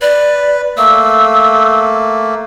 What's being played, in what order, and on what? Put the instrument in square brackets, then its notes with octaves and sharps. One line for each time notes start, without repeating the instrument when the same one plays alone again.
[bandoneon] B4 [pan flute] D5
[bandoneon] A3 A#3 [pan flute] E6